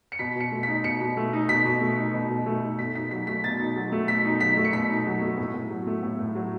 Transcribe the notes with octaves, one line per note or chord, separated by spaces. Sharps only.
C#7
B2 B6
B2 C#7
A3
B6
D#4
B2 C#7
B2
A3
D#4
B2 B6
B2
A3
D#4
B2
B2
A3
D#4
B2 B6
D#4 B6
F#3 B6
A3 B6
B2 A6
D#4
F#3
A3
B2 B6
D#4
F#3 B6
A3
C#7
B2 B6
D#4
F#3
A3
A2
A2
F#3
A3
A2
A2
F#3